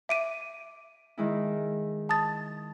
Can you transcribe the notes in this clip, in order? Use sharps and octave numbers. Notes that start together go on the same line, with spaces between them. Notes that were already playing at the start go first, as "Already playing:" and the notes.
E5 D6 D7 D#7
D#3 G#3 E4
A5 D#6 A6